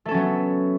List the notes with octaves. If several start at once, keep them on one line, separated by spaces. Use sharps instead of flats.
F#3 A3 B3 C#4 A4